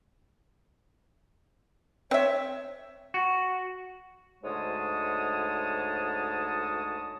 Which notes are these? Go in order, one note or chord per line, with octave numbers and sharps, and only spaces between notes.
C4 C#5 E5
F#4
D2 G#2 G#3 C#5 A5 D#6